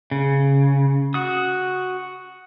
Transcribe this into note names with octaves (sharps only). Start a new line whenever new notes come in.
C#3
F#4 D#6